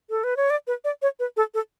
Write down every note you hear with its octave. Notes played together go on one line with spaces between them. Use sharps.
A4
B4
C#5
D5
B4
D5
C#5
B4
A4
A4